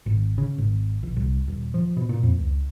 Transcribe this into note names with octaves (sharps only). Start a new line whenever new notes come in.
G#1
C#3
G#1
A#1
C2
D#1
F3
B2
A#2
F2
C#2